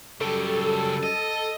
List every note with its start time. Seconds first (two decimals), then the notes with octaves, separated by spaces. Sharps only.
0.21 F#2 C#3 G3 G4 A4
1.03 D#5